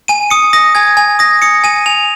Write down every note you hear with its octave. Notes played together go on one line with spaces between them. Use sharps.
G#5 D#7
D#6 C#7
D#6 A#6
G#5 G#6
G#5
D#6 A#6
D#6 C#7
G#5 D#7
G#5 F7